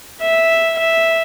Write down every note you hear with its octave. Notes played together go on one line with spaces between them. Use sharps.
E5
E5